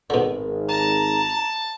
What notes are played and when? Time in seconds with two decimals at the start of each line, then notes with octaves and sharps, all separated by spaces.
0.10 G#1 B2 D3
0.68 A5 A#5